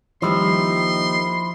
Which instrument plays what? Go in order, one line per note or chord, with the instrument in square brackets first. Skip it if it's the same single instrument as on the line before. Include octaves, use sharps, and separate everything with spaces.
[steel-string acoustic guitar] D#3 G3 A#3 [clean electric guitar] F3 E4 [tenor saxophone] D#4 [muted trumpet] C6